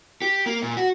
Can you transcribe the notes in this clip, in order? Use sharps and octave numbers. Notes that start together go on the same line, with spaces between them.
G4
A#3
A#2
F#4